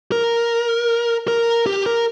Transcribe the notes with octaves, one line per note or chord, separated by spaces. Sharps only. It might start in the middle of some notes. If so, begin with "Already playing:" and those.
A#4
A#4
G4
A#4